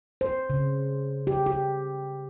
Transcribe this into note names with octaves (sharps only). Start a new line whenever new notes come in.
C5
C#3
G4
G4